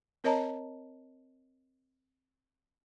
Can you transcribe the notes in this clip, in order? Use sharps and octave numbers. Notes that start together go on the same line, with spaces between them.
C4 A#4 C#5 D#5 A5 A#5